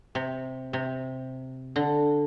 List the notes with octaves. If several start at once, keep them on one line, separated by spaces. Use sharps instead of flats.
C3
C3
D3